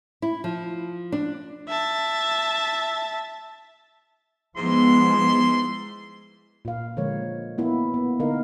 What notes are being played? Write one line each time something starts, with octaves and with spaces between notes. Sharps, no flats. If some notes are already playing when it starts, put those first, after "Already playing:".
E4
F3
D4
E5 A5
G#2 F3 G#3 B3 E4 C6
A#2 F5
D3 F3 G#3 A#3 C#5
A#3 B3 E4
B3
D3 A#3 B3 D#4 A#4 F5